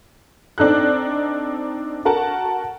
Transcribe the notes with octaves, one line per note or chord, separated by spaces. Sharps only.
C4 D4 D#4 A4 F#6
F#4 A#4 F#5 A5